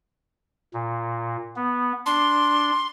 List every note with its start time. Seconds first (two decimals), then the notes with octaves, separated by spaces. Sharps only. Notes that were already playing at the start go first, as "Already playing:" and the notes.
0.73 A#2
1.56 B3
2.06 D4 C6